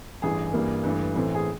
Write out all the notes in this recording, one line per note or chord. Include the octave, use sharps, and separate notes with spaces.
A1 G2 E3 G#4
G2 E3 G3 A#3
G2 E3 A3
A1 A2 E3 A3 C4
G#4